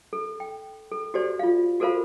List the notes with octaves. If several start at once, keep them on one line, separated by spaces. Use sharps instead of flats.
A4
G5
A4
F#4 G4 A4 C5 D5
F4 F5
F#4 A4 A#4 C5 F5 B5